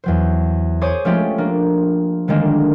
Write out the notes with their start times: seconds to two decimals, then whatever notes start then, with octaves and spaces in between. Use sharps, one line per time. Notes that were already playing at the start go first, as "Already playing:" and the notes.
0.04 E2 F#3 C5
0.82 G#4 C5 C#5 D6 D#6 G#6
1.05 F3 G#3 A3 C#4 F4 G4
1.38 A#3 D4
2.28 D3 D#3 G3 G#3 A#3 D4